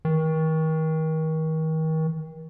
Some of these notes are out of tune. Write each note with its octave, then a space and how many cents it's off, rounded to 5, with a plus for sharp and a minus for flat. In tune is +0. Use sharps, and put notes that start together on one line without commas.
D#3 +35